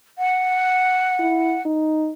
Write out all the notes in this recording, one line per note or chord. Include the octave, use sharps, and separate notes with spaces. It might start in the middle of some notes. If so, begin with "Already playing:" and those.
F#5
E4
D#4